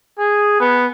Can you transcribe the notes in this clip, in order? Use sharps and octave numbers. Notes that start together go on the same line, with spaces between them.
G#4
B3